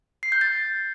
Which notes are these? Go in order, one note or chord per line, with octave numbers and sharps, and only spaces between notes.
C7
G6
A6